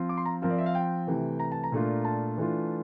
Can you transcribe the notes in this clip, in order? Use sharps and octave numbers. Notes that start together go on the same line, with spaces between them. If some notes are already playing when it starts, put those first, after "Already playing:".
Already playing: F3 C4 F4
D6
C6
A#5
F3 C4 F4 A#4
D5
E5
F5
G5
C3 E3 A3
A#5
A5
A#5
A#2 A3 D4 F4
A5
E3 A3 D4 F4